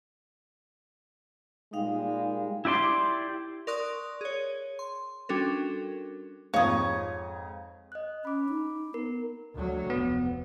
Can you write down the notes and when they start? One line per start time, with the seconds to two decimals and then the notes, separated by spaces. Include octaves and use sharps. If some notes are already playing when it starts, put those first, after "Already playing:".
1.73 A#2 G3 G#3 D#4 F5 G5
2.65 E4 G4 D5 C6 D6
3.67 A#4 D5 C6 C#6 D#6 F#6
4.21 G#4 C#5
4.79 C6
5.29 G3 C#4 D4 F#4 A4 A#4
6.54 F2 G#2 C#5 F5 D#6 G#6
7.92 D#5 F#6
8.25 C#4 B5 D6
8.49 D#4
8.94 B3 A#4
9.54 D2 F#3
9.90 F1 B3